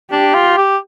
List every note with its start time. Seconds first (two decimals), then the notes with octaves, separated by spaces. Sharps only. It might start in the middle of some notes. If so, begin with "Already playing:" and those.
0.12 D4 G4
0.34 F4
0.57 G4